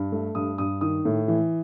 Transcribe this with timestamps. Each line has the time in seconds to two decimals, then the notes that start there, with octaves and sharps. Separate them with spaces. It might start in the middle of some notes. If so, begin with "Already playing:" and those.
Already playing: G2
0.12 A3
0.35 G2 D#6
0.58 G2 D#6
0.81 D#3 D#6
1.05 A2
1.28 E3